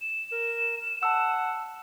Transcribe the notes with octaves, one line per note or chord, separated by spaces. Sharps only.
E7
A#4
F#5 A5 E6